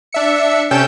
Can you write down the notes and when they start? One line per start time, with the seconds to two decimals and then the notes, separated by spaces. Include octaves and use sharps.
0.13 D4 E5 C#7
0.71 C3 C#4 A4 G5 G6 E7